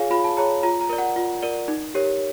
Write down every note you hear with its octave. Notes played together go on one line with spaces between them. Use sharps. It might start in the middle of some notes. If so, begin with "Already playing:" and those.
Already playing: F4 G#4 C#5 F5 G#5
F4 B5
A5
G#4 C#5 A#5
F4 A#5
A#5
A#4 D5
F#5
F4
A#4 D5
D#4
G4 A#4 C#5